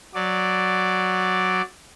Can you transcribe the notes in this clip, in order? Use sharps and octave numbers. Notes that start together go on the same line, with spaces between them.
F#3 D5